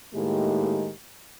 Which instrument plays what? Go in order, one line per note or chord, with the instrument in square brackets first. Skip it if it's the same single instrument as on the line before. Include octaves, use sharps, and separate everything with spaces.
[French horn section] A2 D#3 G#3 A#3 G4